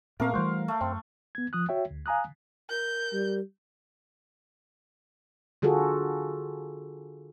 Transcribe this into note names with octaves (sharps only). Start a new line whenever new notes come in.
A#2 A3 A#3 C4 A#4 F5
E3 G3 A3 F#4 C5
A3
F#2 C4
B3 G#6
F3 D#6 F#6
F#4 C#5 E5 G5
D2
F5 G#5 A#5 D#6 F#6
A#4 G6
G3
D3 F4 F#4 G#4 A4